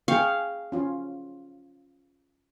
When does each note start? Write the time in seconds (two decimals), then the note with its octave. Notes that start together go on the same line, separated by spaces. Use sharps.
0.08 G#4 F5 G5 C#6
0.72 C#4 F4